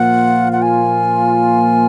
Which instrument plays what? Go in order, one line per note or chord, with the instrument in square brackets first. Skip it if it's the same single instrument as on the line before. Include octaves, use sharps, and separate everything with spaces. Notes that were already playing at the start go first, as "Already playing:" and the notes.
Already playing: [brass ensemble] A#2 F3 A#3 F4 [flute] F#5
[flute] F#5
G#5